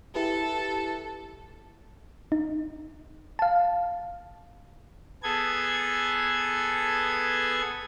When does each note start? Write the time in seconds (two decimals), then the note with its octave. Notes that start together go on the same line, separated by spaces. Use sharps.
0.15 E4 G4 A4 B4
2.32 D#4
3.39 F5 A5
5.23 B3 G#4 A4 G#6